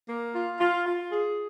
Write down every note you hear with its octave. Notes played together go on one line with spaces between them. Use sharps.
A#3
F4
F4
F4
G#4